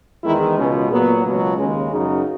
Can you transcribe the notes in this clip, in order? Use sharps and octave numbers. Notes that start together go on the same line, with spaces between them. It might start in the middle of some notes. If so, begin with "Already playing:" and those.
E2 D#3 G#3 E4
C#2 B2 G#3 C#4
A#2 F#3 B3
C#2 B2 F#3
D#2 C#3 G#3 C#4
F#2 C#3 F#3 D#4